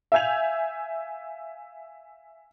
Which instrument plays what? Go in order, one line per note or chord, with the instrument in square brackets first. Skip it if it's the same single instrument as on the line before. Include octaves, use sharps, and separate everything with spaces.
[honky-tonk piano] E5 F5 G#5 G6 G#6 F7